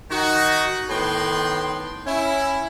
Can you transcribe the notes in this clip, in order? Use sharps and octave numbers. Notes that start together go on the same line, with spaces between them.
D#3 D#4 F#4
A2 D#3 B3 G5 C6
C#4 E4